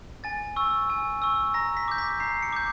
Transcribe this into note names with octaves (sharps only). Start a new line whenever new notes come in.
G#5 A6
C#6 E6
G#5
C#6 E6
A#5 A#6
B6
D6 G6
B6
A#5 C7
C#7
D6 G6